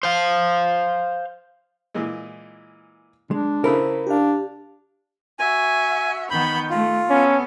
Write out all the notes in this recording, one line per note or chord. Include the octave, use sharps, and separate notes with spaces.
C5 F5
A#2 E3 G#3
G#3 D4
C#3 E4 A4 A#4 C5 A5 B5
D4 G4 F5
F#4 E5 G#5
D#3 B3 B5 G6
A3 F4
B3 C#4 A4